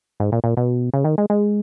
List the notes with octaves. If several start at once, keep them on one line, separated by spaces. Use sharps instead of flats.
G#2
A#2
A#2
B2
C#3
D#3
G#3
G#3